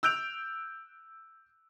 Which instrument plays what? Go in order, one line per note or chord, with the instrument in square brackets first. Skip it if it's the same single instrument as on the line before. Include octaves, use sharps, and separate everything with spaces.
[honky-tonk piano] E6 F#6 G6 D7 F7